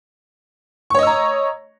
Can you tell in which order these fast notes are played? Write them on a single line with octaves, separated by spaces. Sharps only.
C#6 C#5 D#5 E6 A#5